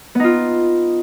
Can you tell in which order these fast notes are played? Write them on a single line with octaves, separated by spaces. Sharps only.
B3 D#4 F4